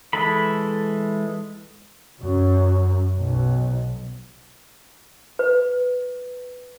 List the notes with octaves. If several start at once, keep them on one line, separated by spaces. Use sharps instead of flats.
E3 G#3 A4 B5
F#2
B1
B4